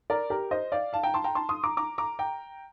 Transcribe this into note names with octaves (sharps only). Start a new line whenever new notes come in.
A#4 D5
G4 A#4
C5 D#5
D5 F5
F5 A5
G5 A#5
A5 C6
G5 A#5
A5 C6
C6 D#6
A#5 D6
A#5 D6
A#5 D6
G5 A#5